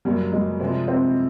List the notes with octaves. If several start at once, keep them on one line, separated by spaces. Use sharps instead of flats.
F#2 C#3 F#3 G3 A#3 C#4
G#3
C3 F3 G#3 C4
C4